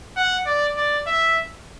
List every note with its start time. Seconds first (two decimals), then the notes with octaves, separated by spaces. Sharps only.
0.17 F#5
0.46 D5
0.77 D5
1.07 E5